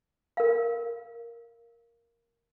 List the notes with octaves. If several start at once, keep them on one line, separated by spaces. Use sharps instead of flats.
A#4 F5